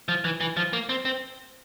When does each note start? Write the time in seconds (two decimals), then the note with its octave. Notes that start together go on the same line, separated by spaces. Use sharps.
0.08 F3
0.24 E3
0.41 E3
0.57 F3
0.73 A#3
0.89 C4
1.05 C4